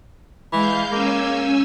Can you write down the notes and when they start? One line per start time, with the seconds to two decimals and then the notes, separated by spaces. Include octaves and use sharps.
0.52 E3 G#3 F5 G6
0.92 A#3 C#4 G#5 E6